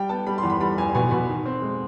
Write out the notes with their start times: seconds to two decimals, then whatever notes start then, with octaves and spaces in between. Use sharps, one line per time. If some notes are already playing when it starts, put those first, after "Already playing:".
Already playing: G3 G5
0.09 B3 A5
0.27 G3 B5
0.38 E2 C6
0.50 B5
0.60 G3 B5
0.78 E2 G#5
0.94 B2 G#5
1.11 B2 B5
1.29 D#3
1.45 C4
1.62 G#3